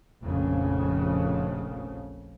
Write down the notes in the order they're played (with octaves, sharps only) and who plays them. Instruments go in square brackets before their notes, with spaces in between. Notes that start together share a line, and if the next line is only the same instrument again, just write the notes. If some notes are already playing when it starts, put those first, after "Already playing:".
[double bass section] F1 A#1 F2 C#3